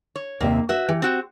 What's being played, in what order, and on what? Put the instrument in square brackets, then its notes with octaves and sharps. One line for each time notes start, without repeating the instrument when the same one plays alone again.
[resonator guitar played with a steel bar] C#5
[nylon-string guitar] D#2 C3 E5 [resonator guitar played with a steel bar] A#3
[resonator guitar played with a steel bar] F#4 E5 [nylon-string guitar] B4
[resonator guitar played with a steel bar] E3 [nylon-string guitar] G4
[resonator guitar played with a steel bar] C4 F#4 G5